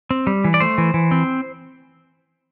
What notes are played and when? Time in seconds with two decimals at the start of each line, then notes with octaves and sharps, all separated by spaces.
0.11 C4
0.27 G3
0.44 E3
0.54 D5
0.60 A3 C5
0.78 E3
0.94 E3
1.11 C4